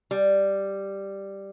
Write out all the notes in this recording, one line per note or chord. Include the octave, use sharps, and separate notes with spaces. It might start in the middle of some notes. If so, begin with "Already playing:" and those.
G3